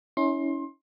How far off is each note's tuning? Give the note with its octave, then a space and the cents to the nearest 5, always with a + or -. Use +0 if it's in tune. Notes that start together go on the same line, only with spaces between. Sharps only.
C#4 +10 E4 -35 C6 +25